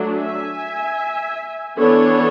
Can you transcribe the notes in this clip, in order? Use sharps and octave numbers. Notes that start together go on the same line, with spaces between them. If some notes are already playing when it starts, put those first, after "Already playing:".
Already playing: F#3 A3 D4
E5 G#5
E3 B3 D4 A4 C#5